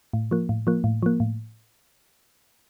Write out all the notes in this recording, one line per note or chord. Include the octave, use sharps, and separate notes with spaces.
A2
F3 A#3
A2
F3 A#3
A2
F3 A#3
A2